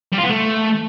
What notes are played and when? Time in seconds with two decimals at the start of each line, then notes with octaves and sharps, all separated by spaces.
0.12 G3
0.18 F4
0.24 B3
0.30 A3